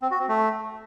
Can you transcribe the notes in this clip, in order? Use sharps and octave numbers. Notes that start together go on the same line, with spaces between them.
C4
F#4
C4
A3